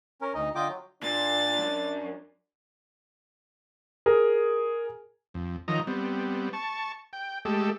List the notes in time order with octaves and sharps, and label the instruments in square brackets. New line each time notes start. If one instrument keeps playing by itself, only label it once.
[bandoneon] C#4 A#4
D2 D#4 D#5
D3 F4 D#5 G5 D6
F#3
[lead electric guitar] A#2 [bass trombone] D4 [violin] A6
[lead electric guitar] F#2
[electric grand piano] G#4 A#4
[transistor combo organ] F2
D#3 F3 F#3 D#5 A#5
G3 B3 C4
A5 C#6
G5
G#3 A3 G4 A4